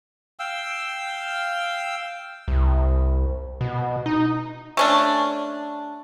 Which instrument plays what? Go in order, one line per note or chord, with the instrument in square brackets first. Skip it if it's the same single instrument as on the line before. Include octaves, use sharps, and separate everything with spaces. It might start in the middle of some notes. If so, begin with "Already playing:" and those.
[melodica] F5 G5 E6
[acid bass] C2
B2
D#4
[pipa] A3 C#4 D4